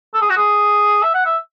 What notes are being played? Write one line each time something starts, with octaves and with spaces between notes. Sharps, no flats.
A4
G#4
F#4
G#4
E5
F#5
E5